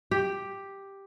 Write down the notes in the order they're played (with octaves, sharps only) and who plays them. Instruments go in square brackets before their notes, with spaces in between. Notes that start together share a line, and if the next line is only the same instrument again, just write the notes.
[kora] G4